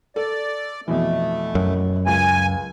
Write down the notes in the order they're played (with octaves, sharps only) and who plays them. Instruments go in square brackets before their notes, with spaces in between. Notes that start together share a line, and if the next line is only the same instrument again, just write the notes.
[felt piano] A4 [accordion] D5
[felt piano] F2 B2 E3 [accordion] A3
[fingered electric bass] F#2
[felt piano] C#2 [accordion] G#5